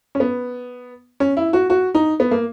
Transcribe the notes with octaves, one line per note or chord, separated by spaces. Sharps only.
C#4
B3
C#4
E4
F#4
F#4
D#4
B3
A#3